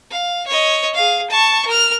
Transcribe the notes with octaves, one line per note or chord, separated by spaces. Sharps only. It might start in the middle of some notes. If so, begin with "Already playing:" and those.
F5
C#5 D#5
G#4 F5
A5 C#6
A#4 F6